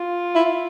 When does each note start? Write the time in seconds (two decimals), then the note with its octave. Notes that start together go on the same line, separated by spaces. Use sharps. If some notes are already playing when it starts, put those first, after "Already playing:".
Already playing: F4
0.35 E4